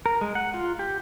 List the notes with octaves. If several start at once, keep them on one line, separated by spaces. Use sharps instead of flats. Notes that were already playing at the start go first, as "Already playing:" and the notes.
A#4
G#3
F#5
F4
G4